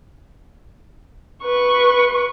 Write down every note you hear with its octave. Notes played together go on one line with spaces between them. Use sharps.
B4 C#6